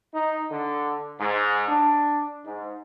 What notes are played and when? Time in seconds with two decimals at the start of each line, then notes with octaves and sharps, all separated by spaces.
0.14 D#4
0.51 D3
1.20 G#2
1.68 D4
2.45 G#2